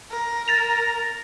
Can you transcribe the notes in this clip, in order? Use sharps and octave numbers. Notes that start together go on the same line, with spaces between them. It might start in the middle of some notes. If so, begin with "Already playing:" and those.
A#4
A6 A#6 F7